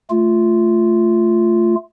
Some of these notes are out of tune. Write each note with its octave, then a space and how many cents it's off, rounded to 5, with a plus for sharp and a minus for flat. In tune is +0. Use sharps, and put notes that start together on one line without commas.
A3 +0 F4 -5